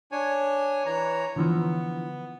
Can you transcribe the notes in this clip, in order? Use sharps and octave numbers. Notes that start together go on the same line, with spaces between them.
D4 C#5 G#5
E3 C#5 A#5
D3 E3 F3 B3